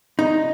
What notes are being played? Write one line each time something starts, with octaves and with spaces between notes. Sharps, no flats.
D#4